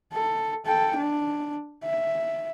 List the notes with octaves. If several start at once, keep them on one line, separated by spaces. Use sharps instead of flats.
A4
A4 G5
D4
E5